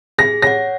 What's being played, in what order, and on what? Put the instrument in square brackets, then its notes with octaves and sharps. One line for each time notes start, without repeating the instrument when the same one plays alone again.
[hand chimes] G#4 [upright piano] A#6
[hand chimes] C#5 F#5 [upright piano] A#6